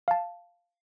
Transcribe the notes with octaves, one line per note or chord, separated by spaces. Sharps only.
F5 A5